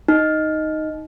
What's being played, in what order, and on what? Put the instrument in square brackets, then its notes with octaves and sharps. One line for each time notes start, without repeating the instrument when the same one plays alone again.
[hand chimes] D#4